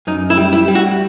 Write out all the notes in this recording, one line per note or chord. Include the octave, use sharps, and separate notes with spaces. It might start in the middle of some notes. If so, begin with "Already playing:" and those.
F#2 D#4
E4
G3
E4
G3
F#4